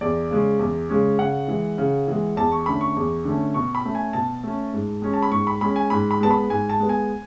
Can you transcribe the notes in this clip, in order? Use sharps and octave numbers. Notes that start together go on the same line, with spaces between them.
E2 D5
C#3 G#3 C#4
E2
C#3 G#3 C#4
C#3 F#5
E3 G#3
C#3
E3 G#3
E2 A5
C#6
D3 A3 C#4 B5
C#6
E2
D3 A3 C#4
B2 C#6
B5
A3 C#4
G#5
B2 A5
A3 C#4
G#2
G#3 C#4
A5
B5
G#2 C#6
B5
G#3 C#4 B5
G#5
G#2 B5
B5
G#3 B3 A5
B5
G#2 G#5
A5
G#3 B3
G#5